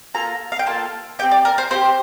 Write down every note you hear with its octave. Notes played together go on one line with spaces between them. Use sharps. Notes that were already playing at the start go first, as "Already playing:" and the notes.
A#3 F4 A4 A#5
F5
G5
A#3 F4 A4 A5
C4 G4 G5
D5
A#4
C5
C4 E4 G4 C5